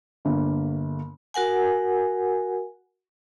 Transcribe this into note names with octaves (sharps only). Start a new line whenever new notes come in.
G1 D3 A#3
F#4 A#4 F#5 G#5